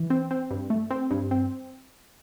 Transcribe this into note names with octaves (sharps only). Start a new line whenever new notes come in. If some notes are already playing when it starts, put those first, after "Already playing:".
Already playing: E3
C4
C4
G2
A3
C4
G2
C4